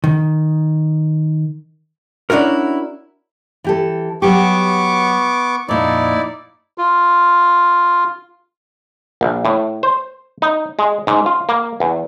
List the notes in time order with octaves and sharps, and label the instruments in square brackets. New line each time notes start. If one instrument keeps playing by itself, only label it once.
[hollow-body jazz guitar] D#3
C#4 D4 E4 F#4 A#4
[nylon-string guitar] E3 G4 A4
[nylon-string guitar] F#3 G4 [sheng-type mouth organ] B3 C#6 D6
[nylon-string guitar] F2 A#2 [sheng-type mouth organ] D#4 E4 D5
[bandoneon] F4
[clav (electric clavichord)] A#1
A2
C5
D#4
G#3
G#2
F4
A#3
E2